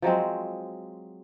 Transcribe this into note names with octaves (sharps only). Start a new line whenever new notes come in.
F3 F#3 G#3 C4